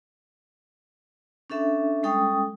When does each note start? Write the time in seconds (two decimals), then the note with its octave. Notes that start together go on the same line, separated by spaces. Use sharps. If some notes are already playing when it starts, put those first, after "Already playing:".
1.50 C#4 D4 A4 E5
2.03 G3 G#3 C#4 A4 G5 D#6